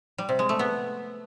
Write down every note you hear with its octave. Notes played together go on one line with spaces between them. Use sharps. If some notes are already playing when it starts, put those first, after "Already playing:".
G3
C3
G#3
A3
B3